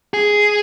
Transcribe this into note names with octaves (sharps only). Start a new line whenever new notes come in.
G#4